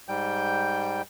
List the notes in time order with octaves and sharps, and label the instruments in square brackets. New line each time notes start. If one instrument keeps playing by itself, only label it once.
[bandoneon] G#2 G3 G5 G6